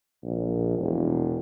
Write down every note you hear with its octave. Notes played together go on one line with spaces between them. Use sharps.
A#1
E1